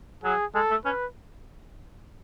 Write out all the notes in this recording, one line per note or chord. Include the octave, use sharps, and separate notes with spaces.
F#3 G#4
G#3 A4
A3
C#4 B4